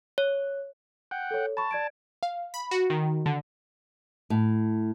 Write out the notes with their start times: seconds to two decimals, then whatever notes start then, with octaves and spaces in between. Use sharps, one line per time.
0.18 C#5
1.11 F#5 G5
1.31 A4 C#5
1.57 A5 B5 C#6
1.71 D5 G#6 D7
2.23 F5
2.54 B5
2.71 F#4
2.90 D#3
3.26 D3
4.30 A2